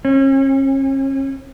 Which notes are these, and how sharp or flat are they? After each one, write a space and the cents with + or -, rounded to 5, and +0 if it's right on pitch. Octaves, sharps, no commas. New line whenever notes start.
C#4 -40